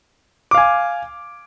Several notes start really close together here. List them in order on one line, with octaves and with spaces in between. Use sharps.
D6 F5 G#5